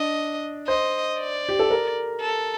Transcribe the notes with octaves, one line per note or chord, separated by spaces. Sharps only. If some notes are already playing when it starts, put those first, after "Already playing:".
Already playing: D4 D#5
C5 D#5
D5
G4
A4
A#4
A4